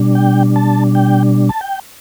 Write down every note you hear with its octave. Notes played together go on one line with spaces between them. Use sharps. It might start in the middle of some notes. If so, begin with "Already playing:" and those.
Already playing: B2 G3 D4
G5
A5
G5
A5
G5